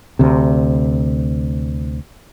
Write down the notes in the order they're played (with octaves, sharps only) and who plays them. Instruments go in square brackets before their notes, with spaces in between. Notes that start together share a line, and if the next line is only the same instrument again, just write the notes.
[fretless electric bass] D2 C3